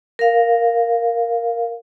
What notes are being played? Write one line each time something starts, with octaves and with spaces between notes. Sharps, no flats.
A#4 F5